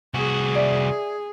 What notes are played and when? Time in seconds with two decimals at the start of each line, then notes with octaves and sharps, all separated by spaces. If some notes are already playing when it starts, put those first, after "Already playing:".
0.14 C2 F#4 G#4
0.55 D5 E5